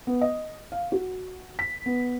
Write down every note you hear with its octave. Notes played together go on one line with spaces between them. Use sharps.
B3
D#5
F5
F#4
B6
B3